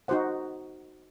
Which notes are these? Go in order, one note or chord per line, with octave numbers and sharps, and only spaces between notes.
D#4 F#4 C5 F#5